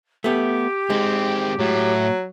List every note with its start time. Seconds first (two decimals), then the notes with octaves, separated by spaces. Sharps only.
0.24 A3 B3 G4
0.90 D#3 G#3 C4
1.59 A2 F#3